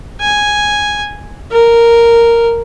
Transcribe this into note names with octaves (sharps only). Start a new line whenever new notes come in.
G#5
A#4